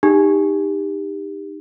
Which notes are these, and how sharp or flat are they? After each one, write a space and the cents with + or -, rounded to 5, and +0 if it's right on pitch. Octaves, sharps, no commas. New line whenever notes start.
D#4 -10 G4 +20